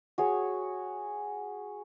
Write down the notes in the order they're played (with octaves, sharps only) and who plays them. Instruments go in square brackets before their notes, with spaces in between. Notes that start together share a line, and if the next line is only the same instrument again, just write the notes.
[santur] F#4 G#4 C#5